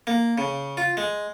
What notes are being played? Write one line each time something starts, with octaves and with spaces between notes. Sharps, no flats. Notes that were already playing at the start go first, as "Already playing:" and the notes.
A#3
C#3
F4
G#3